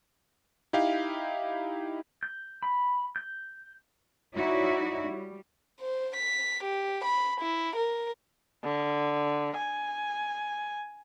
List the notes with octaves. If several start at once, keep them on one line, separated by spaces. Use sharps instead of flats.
D#4 E4 G4 F5
G6
B5
G6
D#4 E4 F#4 C#5 D5 E5
G3
C5
B6
G4
B5
E4
A#4
D3
G#5